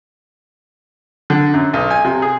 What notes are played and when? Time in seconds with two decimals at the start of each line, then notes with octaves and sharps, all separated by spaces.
1.30 D3
1.54 F#2
1.74 B1
1.91 G#5
2.05 C3
2.22 G#4